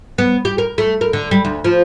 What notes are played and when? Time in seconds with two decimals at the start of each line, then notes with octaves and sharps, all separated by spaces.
0.18 B3
0.45 G4
0.58 A#4
0.78 A3
1.01 A#4
1.13 D3
1.31 G3
1.45 D2
1.64 F3